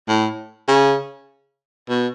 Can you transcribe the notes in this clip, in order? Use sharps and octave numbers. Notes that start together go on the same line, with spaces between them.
A2
C#3
B2